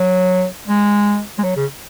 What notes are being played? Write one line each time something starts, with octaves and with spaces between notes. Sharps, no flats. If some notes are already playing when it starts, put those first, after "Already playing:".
Already playing: F#3
G#3
G#3
F#3
C#3